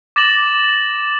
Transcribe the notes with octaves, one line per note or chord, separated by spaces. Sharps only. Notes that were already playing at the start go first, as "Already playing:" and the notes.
D6 A6 A#6 E7 F#7